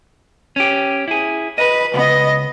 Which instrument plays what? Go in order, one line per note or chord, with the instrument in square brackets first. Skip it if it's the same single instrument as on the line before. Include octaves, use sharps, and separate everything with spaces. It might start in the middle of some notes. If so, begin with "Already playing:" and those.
[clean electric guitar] C#4 G4
E4 G#4
[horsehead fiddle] B4 [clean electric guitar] D#5
[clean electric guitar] C#2 [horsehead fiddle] B3 D#5